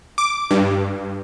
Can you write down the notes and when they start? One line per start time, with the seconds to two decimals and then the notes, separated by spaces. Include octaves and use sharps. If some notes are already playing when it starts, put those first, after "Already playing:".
0.18 D6
0.51 G2